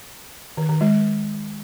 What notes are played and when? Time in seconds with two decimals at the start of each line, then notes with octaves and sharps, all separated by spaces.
0.57 D#3
0.69 D#3
0.81 G#3